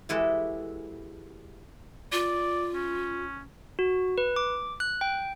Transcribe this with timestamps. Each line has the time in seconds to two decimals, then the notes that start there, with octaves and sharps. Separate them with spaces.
0.09 E3 G#3 E4 F#4 G4 A4
2.12 F4 D5
2.75 C#4
3.79 F#4
4.18 B4
4.36 D6
4.80 F#6
5.01 G5